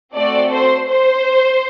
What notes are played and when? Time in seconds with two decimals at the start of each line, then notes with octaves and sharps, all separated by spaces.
0.14 A3 C4 F#4 A4 D5
0.51 C5
0.88 C5